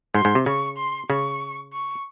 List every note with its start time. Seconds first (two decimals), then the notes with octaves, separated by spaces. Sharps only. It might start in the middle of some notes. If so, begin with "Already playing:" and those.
0.14 G#2 C6
0.25 G#2
0.35 C3
0.46 C#3 C#6
0.77 C6
1.10 C#3 C#6
1.72 C#6